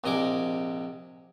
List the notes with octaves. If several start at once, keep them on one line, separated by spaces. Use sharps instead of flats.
A#1 C3 D#5 G#5 D6